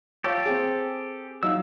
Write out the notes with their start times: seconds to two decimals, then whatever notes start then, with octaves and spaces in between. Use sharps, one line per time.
0.24 G4 A4 C#5 F5
0.46 C4 G#4
1.43 F#3 D#4 F5 E6